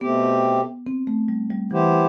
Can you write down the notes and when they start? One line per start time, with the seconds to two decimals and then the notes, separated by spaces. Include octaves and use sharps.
0.01 B2 A3 B3 C4 G4
0.87 C4
1.07 A3
1.28 G3
1.50 G3
1.71 E3 B3 E4 G4 C5